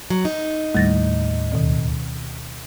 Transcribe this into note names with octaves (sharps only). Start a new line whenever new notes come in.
F#3
D#4
D#2 A2 G3 A6 A#6
D2 B2 D#3